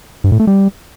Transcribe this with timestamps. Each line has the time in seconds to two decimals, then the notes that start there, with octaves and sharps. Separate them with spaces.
0.24 G2
0.32 A2
0.40 A3
0.47 G3